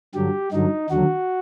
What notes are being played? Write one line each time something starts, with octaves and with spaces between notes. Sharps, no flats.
G2 D3 F#3 G4
G2 D3 F#3 D#4
D#2 D3 F#3 F#4